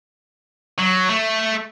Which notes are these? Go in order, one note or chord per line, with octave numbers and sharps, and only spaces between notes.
F#3
A3